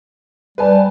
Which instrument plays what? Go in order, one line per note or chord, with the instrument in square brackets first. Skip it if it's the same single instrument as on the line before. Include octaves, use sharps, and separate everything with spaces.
[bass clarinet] G3 [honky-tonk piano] B4 G#5 A5